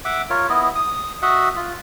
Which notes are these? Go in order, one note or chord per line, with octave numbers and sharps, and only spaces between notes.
E5 F#5 D6
F4 A#4 C#5
B3 E4 D#5
D#6
F#4 D#5 E5 F#5
F4